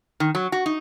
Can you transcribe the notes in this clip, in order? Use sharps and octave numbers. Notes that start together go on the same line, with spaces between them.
D#3
F#3
F#4
D#4